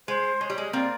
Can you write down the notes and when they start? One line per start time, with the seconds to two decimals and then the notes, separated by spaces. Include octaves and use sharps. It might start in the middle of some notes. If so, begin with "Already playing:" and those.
0.08 G#3 C5
0.41 G#3 C#5
0.50 G3
0.58 G#3
0.73 A#3 C4 D5